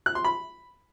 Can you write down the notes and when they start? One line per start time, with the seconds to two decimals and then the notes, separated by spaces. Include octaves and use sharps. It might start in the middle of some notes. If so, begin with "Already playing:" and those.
0.06 F#6
0.15 C6
0.24 B5